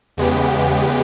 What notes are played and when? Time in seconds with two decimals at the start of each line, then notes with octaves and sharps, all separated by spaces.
0.17 E2 C#3 G#3 B3 G4